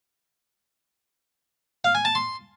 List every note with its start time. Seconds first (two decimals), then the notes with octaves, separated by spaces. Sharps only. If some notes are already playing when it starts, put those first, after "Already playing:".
1.85 F5
1.95 G#5
2.05 A5
2.15 C6